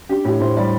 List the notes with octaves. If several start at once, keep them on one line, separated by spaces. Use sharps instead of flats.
D4 G4
A2 G4
A2 C5
G3 D5